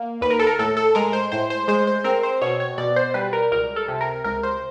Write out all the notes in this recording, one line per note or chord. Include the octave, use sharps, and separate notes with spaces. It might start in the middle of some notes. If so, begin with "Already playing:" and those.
Already playing: A#3
D#2 B4
A#4
A4
A#4
A2 A4
A4
G#3 A#4
C5
A2 C5
C5
G#3 C5
C5
C4 A#4
C5
B2 C#5
C#5
B2 D5
C5
G3 B4
A#4
C#2 A#4
A4
C3
A#4
C#2 A#4
C5